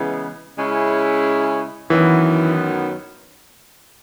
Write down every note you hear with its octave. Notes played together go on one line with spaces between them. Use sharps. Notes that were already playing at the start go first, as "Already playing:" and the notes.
Already playing: C#3 E3 G#3 B3
C#3 G#3 C#4 E4
F#2 D#3 E3 F#3 B3